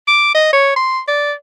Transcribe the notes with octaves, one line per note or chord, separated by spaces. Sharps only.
D6
D#5
C#5
C6
D5